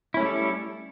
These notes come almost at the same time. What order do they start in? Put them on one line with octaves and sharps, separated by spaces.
E4 C#4 A3 G3 A4